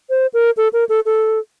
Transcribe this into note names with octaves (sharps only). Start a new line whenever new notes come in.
C5
A#4
A4
A#4
A4
A4